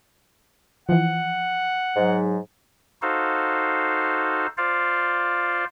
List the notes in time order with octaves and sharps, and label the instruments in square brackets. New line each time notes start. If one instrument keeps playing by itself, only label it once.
[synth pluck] E3 F3 [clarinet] F#5
[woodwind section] G#2 F#3
[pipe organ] D#4 F#4 A4 C5 F5
F4 C5 D5 F5